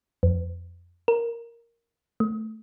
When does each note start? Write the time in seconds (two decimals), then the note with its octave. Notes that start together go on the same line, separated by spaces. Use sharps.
0.23 F2
1.08 A#4
2.20 A3